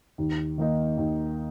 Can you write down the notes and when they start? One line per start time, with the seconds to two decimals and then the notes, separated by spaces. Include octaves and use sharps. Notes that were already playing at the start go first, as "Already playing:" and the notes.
0.18 D#2
0.58 D#3 A#3 D#4
0.98 D#2